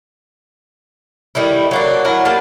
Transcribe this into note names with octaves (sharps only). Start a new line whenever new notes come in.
D#3 G3 A3 E4
F#3 A#3 D4
F#3 E4 A#4
G3 A#3 A5